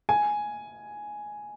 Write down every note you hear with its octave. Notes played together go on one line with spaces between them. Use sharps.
G#5